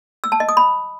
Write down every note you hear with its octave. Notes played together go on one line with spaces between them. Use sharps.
E6
A5
D#5
D#6
B5